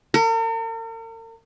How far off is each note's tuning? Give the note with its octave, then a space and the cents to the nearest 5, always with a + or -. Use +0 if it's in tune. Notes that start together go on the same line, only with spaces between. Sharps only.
A#4 -45